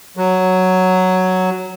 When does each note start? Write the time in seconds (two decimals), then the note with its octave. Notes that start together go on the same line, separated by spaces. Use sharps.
0.17 F#3